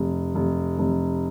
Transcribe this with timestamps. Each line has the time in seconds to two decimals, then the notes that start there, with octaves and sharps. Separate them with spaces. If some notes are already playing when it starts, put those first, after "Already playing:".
Already playing: F1
0.35 F1
0.78 F1